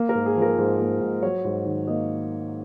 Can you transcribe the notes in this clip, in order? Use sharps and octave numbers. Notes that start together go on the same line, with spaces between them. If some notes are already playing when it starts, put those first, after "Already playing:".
Already playing: A#3
A#4
G#2
G#4
F3
A#4
G#2
A#3
G#2
F#3 C#5
G#2
D#3
A#3 D#5